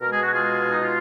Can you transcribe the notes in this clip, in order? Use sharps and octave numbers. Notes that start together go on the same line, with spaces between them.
B2 G#3 A#4
G#4
F#4
F4 G#4
D#4
F4